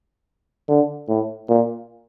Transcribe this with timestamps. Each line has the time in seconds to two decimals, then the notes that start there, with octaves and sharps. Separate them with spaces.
0.69 D3
1.08 A2
1.49 A#2